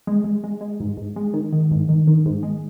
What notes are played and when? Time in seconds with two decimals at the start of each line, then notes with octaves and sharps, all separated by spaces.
0.07 G#3
0.24 G#3
0.44 G#3
0.61 G#3
0.80 G#2
0.97 G#2
1.16 G#3
1.34 D#3
1.52 D#3
1.71 G#2
1.89 D#3
2.07 D#3
2.26 G#2
2.43 G#3